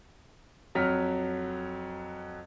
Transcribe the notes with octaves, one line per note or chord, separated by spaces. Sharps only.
F2 F#3 F6 B6